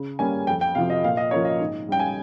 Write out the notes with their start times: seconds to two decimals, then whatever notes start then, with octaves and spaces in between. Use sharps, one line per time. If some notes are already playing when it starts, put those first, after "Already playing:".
Already playing: C#3
0.19 G3 A#3 C#4 G#5
0.47 F2 G5
0.61 G5
0.75 C3 F3 F5
0.90 D#5
1.04 A#2 F5
1.17 D#5
1.31 F3 A#3 C#4 C#5
1.45 D#5
1.60 G#2
1.88 G3 C#4 G5
2.00 G#5